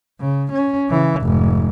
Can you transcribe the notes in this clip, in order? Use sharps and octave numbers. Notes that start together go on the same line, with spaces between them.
C#3
C#4
C#3 E3
F1 G#2